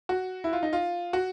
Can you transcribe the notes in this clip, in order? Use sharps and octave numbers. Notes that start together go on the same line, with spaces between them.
F#4
E4
F4
D#4
F4
F#4